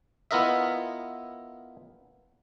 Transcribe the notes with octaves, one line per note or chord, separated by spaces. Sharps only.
B3 E4 F4 A#4 D#5 E5